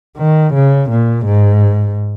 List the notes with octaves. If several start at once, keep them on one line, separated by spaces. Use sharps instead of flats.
D#3
C#3
A#2
G#2